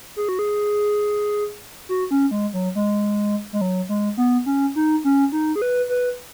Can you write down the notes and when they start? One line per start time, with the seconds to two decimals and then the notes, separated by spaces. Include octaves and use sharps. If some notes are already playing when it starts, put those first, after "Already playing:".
0.16 G#4
0.29 F#4
0.39 G#4
1.89 F#4
2.11 C#4
2.31 G#3
2.54 F#3
2.75 G#3
3.53 G#3
3.61 F#3
3.89 G#3
4.17 B3
4.46 C#4
4.76 D#4
5.04 C#4
5.32 D#4
5.56 G#4
5.62 B4
5.89 B4